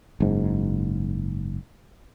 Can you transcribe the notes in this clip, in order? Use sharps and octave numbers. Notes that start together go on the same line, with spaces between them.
F#1 G#2